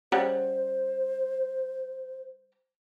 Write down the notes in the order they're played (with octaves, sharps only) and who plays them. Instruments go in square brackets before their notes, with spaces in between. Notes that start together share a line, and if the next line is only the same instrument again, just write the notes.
[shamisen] C#3 G3 F#5 [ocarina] C5